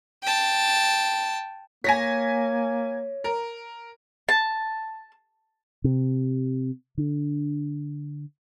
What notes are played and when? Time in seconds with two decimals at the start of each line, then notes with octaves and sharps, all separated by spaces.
0.23 G5 A5
1.84 A#3 C#5 G#5 A#6 B6
3.24 A#4
4.29 A5
5.84 C3
6.97 D3